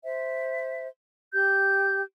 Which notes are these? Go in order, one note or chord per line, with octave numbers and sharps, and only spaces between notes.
C5 E5
G4 G6